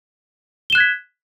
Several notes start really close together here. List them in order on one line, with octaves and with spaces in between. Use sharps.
G7 E7 F#6 G#6 B6